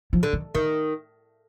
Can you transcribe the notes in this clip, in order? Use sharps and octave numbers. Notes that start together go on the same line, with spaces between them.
F3
D3
D#3
D3 D#3